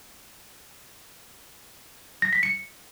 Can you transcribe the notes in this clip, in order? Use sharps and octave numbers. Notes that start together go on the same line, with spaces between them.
A#6
B6
C#7